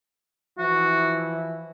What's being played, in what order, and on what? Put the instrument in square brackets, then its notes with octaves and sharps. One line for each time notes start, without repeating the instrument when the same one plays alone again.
[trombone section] E3 F3 E4 [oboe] F#4